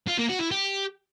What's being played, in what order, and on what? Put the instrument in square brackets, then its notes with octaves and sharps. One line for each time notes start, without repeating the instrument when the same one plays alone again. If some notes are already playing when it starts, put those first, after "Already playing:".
[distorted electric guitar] F4
A#3
F#4
E4
G4